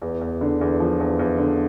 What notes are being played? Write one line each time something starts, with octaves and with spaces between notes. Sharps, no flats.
E2
E2
D3
E2
F3
E2
E2
D3